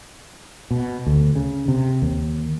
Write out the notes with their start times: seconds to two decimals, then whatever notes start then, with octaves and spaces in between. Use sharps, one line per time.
0.71 B2
1.06 D2
1.36 C#3
1.68 C3
2.02 D#2